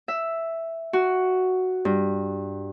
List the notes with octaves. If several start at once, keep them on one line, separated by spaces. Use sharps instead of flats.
E5
F#4
G2